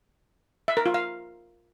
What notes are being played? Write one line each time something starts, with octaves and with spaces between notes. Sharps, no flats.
E5
A#4
F4
F5